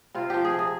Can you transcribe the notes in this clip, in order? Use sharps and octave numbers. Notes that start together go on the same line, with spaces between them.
C3 F4
F3 G4
G#4
C3
G#4